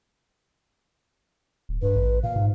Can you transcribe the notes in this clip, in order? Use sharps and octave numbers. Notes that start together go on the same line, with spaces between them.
D1
G2 B4
A1
A#2 F5
G#2